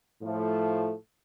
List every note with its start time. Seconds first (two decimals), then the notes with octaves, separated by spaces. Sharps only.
0.22 A2 F3 A3